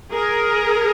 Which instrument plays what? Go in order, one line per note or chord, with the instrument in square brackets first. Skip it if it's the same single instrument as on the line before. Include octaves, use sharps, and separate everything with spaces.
[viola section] G#4 A#4